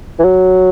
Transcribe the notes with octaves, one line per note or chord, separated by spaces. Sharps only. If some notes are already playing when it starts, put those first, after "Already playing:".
E3
F#3